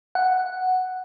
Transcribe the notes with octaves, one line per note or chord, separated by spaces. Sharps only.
F#5